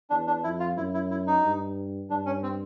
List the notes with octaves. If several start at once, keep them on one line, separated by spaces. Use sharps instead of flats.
E2 D4
D4
F2 E4
F4
F#2 E4
E4
E4
D#4
G2
G2 D4
C#4
C4